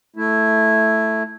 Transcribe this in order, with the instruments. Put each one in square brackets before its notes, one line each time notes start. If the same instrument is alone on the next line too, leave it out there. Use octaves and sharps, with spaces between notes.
[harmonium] A3 E4